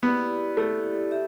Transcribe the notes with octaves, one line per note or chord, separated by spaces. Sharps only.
B3 E4 G4 D5
A3 E4 G4 D5
G4 E5